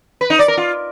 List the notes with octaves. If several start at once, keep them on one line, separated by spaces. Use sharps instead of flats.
B4
D#4
D5
A#4
F4